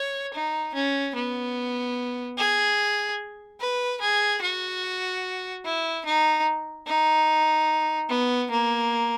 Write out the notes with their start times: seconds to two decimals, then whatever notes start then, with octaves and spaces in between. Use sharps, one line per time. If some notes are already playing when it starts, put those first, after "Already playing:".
Already playing: C#5
0.34 D#4
0.74 C#4
1.15 B3
2.38 G#4
3.61 B4
4.01 G#4
4.42 F#4
5.65 E4
6.06 D#4
6.87 D#4
8.09 B3
8.51 A#3